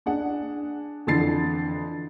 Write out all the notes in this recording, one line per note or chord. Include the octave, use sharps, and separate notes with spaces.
D4 G#4 F#5
F2 D3 E3 A6 C7